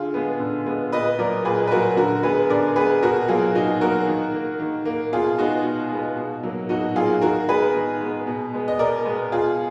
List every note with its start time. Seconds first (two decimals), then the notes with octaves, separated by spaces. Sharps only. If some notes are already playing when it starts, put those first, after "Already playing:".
Already playing: D3 F4 G#4
0.14 G#3 B3
0.40 D3
0.66 G#3 B3
0.92 A#2 B4 D#5
1.19 F#3 A#3 A#4 D5
1.45 A#2 G#4 B4
1.67 B4
1.71 F#3 A#3 F#4 A#4
1.97 D3 F#4 A#4
2.23 G#3 B3 G#4 B4
2.50 D3 A#4 D5
2.76 G#3 B3 G#4 B4
3.02 B2 F#4 A#4
3.29 F#3 A#3 F4 G#4
3.55 B2 D#4 F#4
3.81 F#3 A#3 F#4 A#4
4.08 D#3
4.34 A#3
4.60 D#3
4.85 A#3
5.13 B2 F4 G#4
5.38 G#3 B3 D#4 F#4
5.65 B2
5.91 G#3 B3
6.17 B2
6.43 F#3 A#3
6.69 B2 D#4 F#4
6.96 F#3 A#3 F4 G#4
7.21 D#3 F#4 A#4
7.48 G#3 B3 G#4 B4
7.74 D#3
8.01 G#3 B3
8.27 B2
8.54 G#3 B3
8.68 D#5
8.79 B2 A#4 D5
9.05 G#3 B3
9.31 B2 F4 G#4